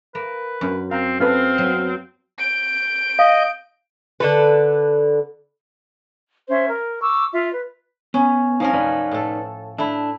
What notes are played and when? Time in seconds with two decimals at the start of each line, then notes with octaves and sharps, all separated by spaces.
0.15 A#3 B4
0.61 F#2 C#4 C#6
0.91 C4 F5 A#5
1.20 C4 C#4 A4 B4 F5
1.58 F#3 B3
2.38 G6 D7
3.19 D#5 F5
4.20 D3 A4 B4
6.49 C#4 C5 E5
6.68 A#4
7.01 C#6 D6 E6
7.33 F4 E5
7.53 B4
8.14 B3 C#4
8.60 F3 C4 C#4 D#4 A#4
8.73 D#4 B4 D5
9.11 A2 A4
9.78 A3 D4 E4